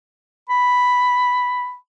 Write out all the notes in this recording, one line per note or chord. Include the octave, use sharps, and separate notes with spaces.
B5